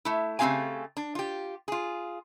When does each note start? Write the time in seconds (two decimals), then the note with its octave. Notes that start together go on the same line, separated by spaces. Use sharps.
0.05 A3 E4
0.39 C#3 A3 C4 G4 F5 G#5
0.97 D4
1.15 F4 G4
1.68 F4 G#4